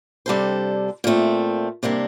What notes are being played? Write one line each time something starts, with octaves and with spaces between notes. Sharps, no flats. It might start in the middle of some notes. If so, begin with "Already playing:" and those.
C3 G3 D4 A4 C5
A#2 A3 C4
C3 G3 A#3 D4